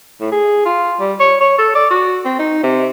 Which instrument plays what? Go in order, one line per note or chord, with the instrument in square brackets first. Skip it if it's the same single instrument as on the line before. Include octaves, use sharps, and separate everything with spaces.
[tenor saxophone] A2
G#4
F4
G3
C#5
C#5
A4
D5
F#4
C4
D#4
C3